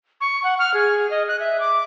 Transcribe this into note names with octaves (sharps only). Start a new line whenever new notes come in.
C#6
F#5
F6
G#4
D#5
F#6
E5
D6